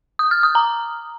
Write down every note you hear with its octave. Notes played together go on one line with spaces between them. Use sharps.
D#6
F6
D#6
A#5